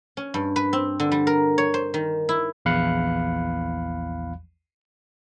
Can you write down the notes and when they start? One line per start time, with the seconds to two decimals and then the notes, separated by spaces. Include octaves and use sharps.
0.17 C#4
0.34 G2
0.56 B4
0.73 C4
1.00 D3
1.12 G3
1.27 A#4
1.58 C#5
1.74 C5
1.94 D#3
2.29 E4
2.65 A#1 E2 F5 B5 F#6 C#7